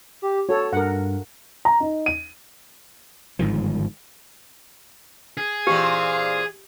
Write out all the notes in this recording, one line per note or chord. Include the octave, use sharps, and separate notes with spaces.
G4
F#4 A4 C#5
G2 A#4 F#5
A#5
D#4
D#7
G1 G#2 D#3 F3
G#4
A#2 E3 C4 G4 F5